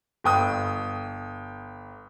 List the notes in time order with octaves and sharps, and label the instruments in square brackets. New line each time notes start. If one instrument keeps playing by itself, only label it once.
[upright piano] G1 G5 D#6